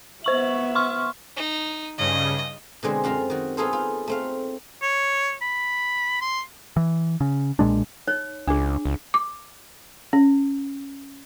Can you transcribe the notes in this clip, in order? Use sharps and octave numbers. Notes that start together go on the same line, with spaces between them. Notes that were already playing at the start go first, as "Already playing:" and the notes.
B3 C5 E5 C#6 F#7
C6 C#6 F6
D#4
G2 C#3 D#5
B2 D3 G#3 C4
F#2 C4 F4 A#5
D#3 F#4
B3 D#4 F4 G#4 A4 C5
F4
A3 C4 F5
C#5
B5
C6
E3
C#3
B1 A#2 G#3 D4
D#4 C#5
C#2 D4 G#4
C#2
D6
C#4